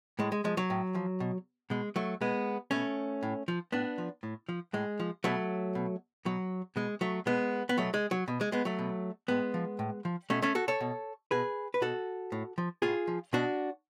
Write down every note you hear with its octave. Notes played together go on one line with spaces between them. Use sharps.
A2 G#3
G#3
F3 G#3
F#3
A2
F3
B2
B2 G#3
F#3 A3
B2 G#3 B3
B2 A3 C#4
A2
F3
A2 B3 D4
F3
A2
F3
A2 G#3
F3
B2 F#3 A3
B2
B2 F#3
B2 G#3
F#3 A3
B2 G#3 B3
B3
B2 F#3 A3
G#3
F#3
B2
G#3
G#3 B3
F#3 A3
B2
A2 G#3 B3
F3
A2
F3
B2 A3 C#4
A3 C#4
F#4 A4
A4 C#5
B2
B2 G#4 B4
B4
B2 F#4 A4
A2
F3
A2 F4 G#4
F3
B2 D4 F#4